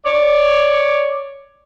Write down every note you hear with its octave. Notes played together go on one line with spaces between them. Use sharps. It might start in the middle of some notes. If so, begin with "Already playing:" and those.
C#5 D5